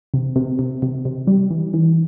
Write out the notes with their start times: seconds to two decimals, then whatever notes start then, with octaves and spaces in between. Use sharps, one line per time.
0.14 C3
0.36 C3
0.59 C3
0.82 C3
1.05 C3
1.27 G3
1.50 E3
1.74 E3